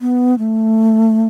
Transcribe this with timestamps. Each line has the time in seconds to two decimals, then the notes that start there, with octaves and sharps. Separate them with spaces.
0.01 B3
0.39 A3